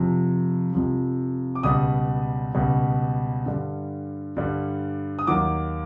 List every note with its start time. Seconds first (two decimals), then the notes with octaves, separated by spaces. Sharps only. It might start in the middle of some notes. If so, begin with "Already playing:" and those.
Already playing: F2 C3 F3
0.73 F2 C3 F3
1.55 D6
1.63 C#2 B2 G3 D#6
2.55 C#2 B2 G3
3.46 G2 D3 G3
4.37 G2 D3 G3
5.19 D#6
5.27 D#2 D#3 F#3 D6